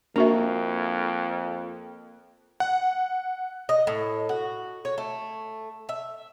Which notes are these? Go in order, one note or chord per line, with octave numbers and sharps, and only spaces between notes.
F2 A#3 D4 F#4 E5
F#5
D#5
A2
F#4
C#5
A3
E5